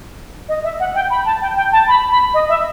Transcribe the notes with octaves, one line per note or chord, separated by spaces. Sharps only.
D#5
E5
F#5
G5
B5
A5
G5
G5
A5
B5
B5
D#5
E5